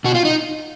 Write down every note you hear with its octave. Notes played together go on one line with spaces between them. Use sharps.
B2 F#4
F4
D#4